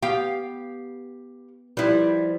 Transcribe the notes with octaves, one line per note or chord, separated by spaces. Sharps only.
B3 G4 F5 G5
F3 G3 E4 B4